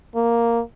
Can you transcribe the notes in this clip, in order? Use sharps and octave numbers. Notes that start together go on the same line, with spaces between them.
A#3